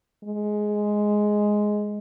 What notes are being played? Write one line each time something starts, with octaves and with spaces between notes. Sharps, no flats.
G#3